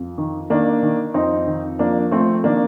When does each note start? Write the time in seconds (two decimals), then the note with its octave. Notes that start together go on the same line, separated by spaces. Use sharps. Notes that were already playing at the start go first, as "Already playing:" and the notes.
Already playing: F2
0.18 D#3
0.50 D#3 A#3 D4
0.83 D#3
1.14 F2 C4 D#4
1.47 D#3
1.79 F3 A#3 D4
2.11 F3 A3 C4
2.44 D#3 A#3 D4